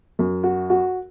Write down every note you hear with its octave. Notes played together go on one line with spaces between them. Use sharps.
F#2
F#4
F#4